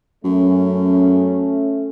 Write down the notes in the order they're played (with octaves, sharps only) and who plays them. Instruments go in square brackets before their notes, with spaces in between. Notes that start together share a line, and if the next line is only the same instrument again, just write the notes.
[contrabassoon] F#2 [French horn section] A3 C#4